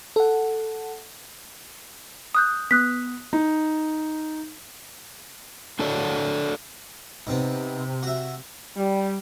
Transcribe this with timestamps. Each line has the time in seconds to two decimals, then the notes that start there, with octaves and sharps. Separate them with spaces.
0.16 A4 F#5
2.35 D#6 F#6 G6
2.71 B3 D#6 F#6 B6
3.33 D#4
5.79 D4 F#4 A4 C#5 D5
7.27 C3 B3 C4 D#4
8.03 F#4 E5
8.77 G3